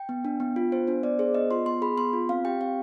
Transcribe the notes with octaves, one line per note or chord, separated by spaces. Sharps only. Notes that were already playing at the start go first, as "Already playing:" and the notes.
Already playing: G5
B3
D4
B3
F4
B3 C5
D4 C5
B3 D5
G#4 C5
B3 D#5
F4 C6
B3 C6
G#4 B5
B3 C6
F4
C4 F5
G4 G5
C4 F5